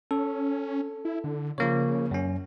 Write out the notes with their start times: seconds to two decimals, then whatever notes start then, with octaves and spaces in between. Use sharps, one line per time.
0.11 C#4 A4
1.05 E4
1.24 D3
1.58 C#3 F3 A#3 C#5
2.11 F#2 C#4